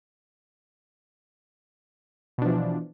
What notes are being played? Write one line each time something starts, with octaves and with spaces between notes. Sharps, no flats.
B2 E3 F3 D4